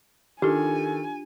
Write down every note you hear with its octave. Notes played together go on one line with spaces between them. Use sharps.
D#3 D4 F4 G4 A4 G#5